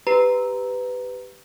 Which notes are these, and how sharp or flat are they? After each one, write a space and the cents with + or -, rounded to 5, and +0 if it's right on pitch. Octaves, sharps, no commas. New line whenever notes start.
G4 +0 B4 +15 A#5 +0